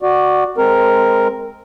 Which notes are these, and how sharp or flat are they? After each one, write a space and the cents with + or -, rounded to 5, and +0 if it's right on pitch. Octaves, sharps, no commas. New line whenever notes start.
F#4 +0 D5 +15
G#3 +0 C4 +0 A#4 +0